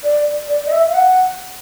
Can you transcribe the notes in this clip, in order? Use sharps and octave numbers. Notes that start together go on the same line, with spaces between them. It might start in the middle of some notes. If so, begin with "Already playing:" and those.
D5
D5
D#5
E5
F5
F#5